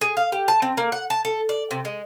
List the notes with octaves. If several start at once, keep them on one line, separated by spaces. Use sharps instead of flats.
G#4
F5
G4
A5
C4
A#3
F#5
A5
A4
D5
C3
G#3